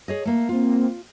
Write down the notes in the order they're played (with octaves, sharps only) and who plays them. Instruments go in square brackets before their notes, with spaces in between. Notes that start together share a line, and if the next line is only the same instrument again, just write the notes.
[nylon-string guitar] G#4 C#5 D#5
A3 A#3
[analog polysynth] A#3 C4 [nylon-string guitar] F4